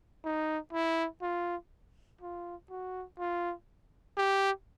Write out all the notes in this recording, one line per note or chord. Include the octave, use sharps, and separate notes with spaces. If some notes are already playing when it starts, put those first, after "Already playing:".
D#4
E4
F4
F4
F#4
F4
G4